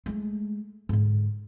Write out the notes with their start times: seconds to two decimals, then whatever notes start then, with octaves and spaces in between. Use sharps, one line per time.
0.06 G#3 A3
0.89 G#2 D3